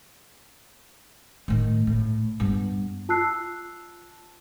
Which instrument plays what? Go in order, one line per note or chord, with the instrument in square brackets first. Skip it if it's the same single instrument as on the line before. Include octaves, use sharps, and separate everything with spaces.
[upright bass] A2 D#3
A2
G2 B3
[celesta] F4 A5 E6 F#6 C7